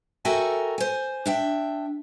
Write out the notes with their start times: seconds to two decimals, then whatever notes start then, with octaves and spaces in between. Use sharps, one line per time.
0.25 F#4 A4 A#4 E5 G5 G#5
0.78 C5 G#5
1.26 D4 E5 G5